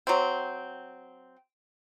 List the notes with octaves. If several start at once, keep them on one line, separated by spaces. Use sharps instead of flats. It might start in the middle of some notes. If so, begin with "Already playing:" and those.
F#3 C4